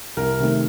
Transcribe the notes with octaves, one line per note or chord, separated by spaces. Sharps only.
C2 A#4
C3 D#3 A3